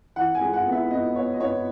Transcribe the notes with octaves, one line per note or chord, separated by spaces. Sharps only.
E3 F#5
G#5
G#3
F#5
B3
E5
B3 D#5
B3 C#5
D#5
B3 C#5